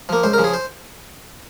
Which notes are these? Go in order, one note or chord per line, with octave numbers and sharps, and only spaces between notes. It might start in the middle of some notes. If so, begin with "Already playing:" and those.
F3 A#3
C#2 C5
A#4
C#3 F3
G#4
C5